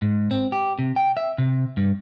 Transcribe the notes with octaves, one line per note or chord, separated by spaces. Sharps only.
G#2
C4
G4
C3
G5
E5
C3
G2